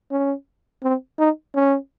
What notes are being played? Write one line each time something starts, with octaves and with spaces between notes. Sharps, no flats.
C#4
C4
D#4
C#4